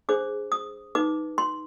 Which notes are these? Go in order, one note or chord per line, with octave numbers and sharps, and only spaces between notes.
D4 G#4 C5 D6
D#6
D#4 B4 D6
C6